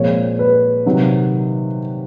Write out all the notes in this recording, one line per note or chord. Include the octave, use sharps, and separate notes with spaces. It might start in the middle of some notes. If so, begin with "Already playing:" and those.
Already playing: A#2 F3 G#3 C4 C#5
B4
C3 D#3 F#3